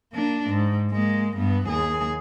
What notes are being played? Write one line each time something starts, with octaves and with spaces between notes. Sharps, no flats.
A#3 D4
G#2
G#3 A#3
G2 B3
D#2 G#4